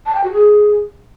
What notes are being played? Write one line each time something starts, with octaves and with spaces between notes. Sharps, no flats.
A5
G5
F#4
G#4